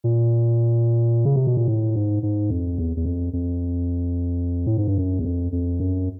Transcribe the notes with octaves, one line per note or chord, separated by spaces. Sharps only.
A#2
C#3
C3
B2
A#2
A2
G#2
G#2
F2
E2
E2
F2
F2
A2
G#2
G2
F#2
E2
F2
F2
F#2